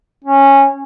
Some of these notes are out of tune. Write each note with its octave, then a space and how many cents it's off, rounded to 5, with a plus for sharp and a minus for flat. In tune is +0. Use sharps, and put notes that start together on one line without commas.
C#4 -15